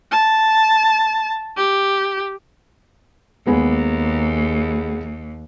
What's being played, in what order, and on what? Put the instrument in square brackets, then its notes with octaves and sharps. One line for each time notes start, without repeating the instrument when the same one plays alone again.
[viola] A5
G4
[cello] D#2 [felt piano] G#3 B3 G#4